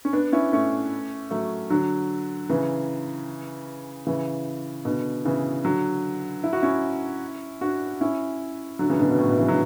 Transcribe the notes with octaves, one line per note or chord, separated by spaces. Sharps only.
C#4
B3 D4
C#4 E4
A3 C#4
F#3 A3
D3 F#3
C#3 E3
C#3 E3
B2 D3
C#3 E3
D3 F#3
E4
F#4
C#4 E4
D4 F#4
C#4 E4
D3 F#3
C#3 E3
B2 D3
B2
A2
B2
C#3 E3
D3 F#3